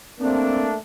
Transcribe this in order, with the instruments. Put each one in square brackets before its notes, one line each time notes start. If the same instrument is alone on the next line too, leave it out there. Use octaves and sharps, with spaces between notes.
[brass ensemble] A3 A#3 D4 [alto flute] C4